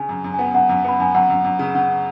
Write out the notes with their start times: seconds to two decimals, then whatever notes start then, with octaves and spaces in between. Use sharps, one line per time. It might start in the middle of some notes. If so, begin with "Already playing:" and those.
Already playing: C#3 G#5
0.09 F#2
0.24 F#2
0.34 B3 G#5
0.54 F#2 F#5
0.69 F#2
0.84 B3 B5
1.00 F#2 G#5
1.14 F#2 F#5
1.30 F#2
1.44 F#2
1.59 C#3
1.74 C#3 F#5